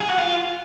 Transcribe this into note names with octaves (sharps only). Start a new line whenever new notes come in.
G#4
F#4
F4